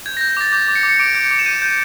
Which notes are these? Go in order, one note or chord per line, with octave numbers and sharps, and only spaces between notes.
G6 G#6
A#6
G6
A#6
D6 A6
D6 G6
D6
C#7
D6
C#7
D6 D7
G6
D6
E7
G6 D#7
G6